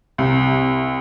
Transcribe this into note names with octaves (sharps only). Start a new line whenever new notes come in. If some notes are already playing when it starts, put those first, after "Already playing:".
C2